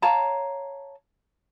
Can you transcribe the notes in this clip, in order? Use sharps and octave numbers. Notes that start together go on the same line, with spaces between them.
C#5 F5 A5 A#5